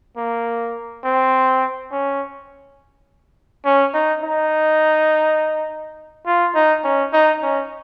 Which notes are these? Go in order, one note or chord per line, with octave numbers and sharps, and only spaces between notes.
A#3
C4
C#4
C#4
D#4
D#4
F4
D#4
C#4
D#4
C#4